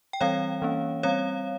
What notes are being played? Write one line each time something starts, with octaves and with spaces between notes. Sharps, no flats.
G5
E3 G3 C4 C#5 F5
E3 A#3 C#4
G3 C4 C#5 F5